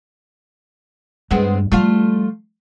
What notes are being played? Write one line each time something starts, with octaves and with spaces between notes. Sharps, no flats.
G2 G#3 B3 C4
F3 G3 A3 F4 F5